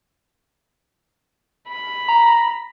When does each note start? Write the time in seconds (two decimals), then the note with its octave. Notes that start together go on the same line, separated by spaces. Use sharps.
1.68 B5
2.08 A#5